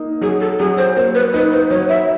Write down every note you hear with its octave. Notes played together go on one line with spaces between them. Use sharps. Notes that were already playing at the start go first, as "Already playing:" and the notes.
Already playing: A#3 D#4
F#3 G#4
A4
F#3 G#4
C5
A#3 C5
B4
D#4 B4
C5
F#3 C#5
E5